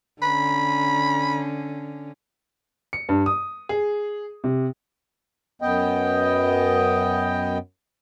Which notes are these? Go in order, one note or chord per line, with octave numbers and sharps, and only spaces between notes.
D3 C#4 B5
C#7
G2
D#6
G#4
C3
F#2 B3 D#5 G5